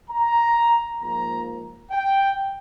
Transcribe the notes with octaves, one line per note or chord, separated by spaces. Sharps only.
A#5
G#2 F3 A#3 A#5
G5